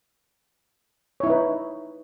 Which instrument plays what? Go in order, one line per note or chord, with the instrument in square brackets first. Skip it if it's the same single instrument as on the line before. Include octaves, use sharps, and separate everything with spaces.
[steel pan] C#5
E4
D#4
B4